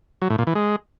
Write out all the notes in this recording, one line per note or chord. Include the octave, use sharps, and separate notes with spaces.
F#3
A2
A#2
E3
G#3